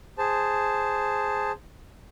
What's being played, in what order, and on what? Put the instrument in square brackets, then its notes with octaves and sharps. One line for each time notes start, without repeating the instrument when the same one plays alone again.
[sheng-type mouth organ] G#4 C5 A5